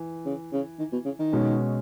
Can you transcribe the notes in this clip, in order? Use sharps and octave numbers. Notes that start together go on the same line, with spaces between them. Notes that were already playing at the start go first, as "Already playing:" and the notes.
Already playing: E3
C#3
C#3
D#3
B2
C#3
D#3
B2 G#3 C#4